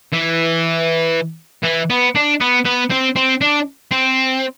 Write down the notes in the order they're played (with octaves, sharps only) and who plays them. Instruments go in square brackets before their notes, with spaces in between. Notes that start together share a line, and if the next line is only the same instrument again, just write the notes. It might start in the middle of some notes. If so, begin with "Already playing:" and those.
[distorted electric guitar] E3
E3
B3
D4
B3
B3
C4
C4
D4
C4